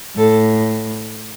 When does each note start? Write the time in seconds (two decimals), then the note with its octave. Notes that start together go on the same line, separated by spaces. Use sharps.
0.17 A2 A4